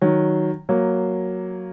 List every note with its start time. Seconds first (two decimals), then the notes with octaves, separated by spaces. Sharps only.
0.01 D#3 F#3
0.69 F#3 A#3